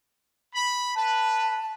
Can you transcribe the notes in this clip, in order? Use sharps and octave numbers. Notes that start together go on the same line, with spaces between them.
B5
B4 A5